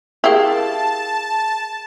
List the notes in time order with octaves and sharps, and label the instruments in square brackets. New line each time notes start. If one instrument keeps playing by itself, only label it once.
[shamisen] E4 G4 [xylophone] G#4 A#4 F5 [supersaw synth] A5